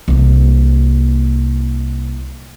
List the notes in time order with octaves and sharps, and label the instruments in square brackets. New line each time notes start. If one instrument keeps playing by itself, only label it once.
[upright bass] C2 A#3